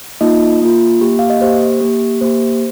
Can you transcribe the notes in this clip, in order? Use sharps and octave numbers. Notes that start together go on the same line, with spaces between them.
A#3 D#4 F4 D#5
A#3 F4
A#3 G4
F5
D#5
A#3 G4 C5
A#3 G4
A#3 G4 C5